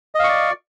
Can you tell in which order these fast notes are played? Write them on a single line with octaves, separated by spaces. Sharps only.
D#5 F5 C#6 D5